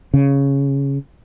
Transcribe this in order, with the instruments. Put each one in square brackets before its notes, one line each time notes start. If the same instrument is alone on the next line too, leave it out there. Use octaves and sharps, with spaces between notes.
[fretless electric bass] C#3